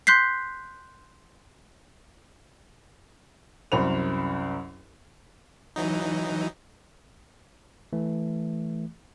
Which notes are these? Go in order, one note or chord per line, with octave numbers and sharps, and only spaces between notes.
C6 F#6 G6 B6 C7
C2 F#2 C5 B5 F7
E3 F#3 D#4
E3 A3